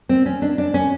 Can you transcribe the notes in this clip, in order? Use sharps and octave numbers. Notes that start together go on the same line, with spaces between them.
C4
C#4
D4
D4
C#4